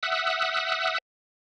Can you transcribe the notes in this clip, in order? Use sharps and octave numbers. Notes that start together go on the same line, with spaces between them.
E5 F#5 D#6 E6 F#6